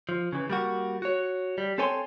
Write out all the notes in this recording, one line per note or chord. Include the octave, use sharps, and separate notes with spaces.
F3
C#3 E3
G3 A#3 F#4
F#4 C#5
G3
C4 A4 C#5 G#5 C6